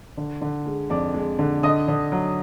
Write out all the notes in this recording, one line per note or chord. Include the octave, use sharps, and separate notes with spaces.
D3
D3
G#3
F2 D5 D6
G#3
D3
D3 D#5 D#6
D3
F#3